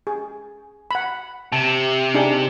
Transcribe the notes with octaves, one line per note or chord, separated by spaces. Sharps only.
G#4
F#5 B5
C3 A5
D4 D#4 G#4